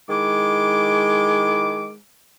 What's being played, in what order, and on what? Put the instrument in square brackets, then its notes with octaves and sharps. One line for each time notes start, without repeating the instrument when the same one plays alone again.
[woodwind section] D#3 E4 D6 [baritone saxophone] G#3